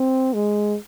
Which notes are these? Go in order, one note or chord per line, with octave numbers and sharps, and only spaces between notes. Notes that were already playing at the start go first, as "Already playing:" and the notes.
Already playing: C4
G#3